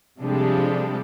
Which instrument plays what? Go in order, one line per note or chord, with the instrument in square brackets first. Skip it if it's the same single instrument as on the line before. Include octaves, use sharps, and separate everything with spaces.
[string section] C3 F3 G3 G#3 D4 A4